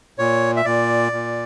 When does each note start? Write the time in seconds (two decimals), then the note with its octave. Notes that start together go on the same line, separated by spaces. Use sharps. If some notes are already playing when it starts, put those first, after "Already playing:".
0.19 A#2 C#5
0.57 E5
0.65 A#2 D5
1.12 A#2